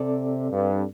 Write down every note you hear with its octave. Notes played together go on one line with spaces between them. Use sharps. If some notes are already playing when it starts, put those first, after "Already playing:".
Already playing: C3 C4 A4 D5
G2